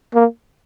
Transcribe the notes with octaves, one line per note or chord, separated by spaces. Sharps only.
A#3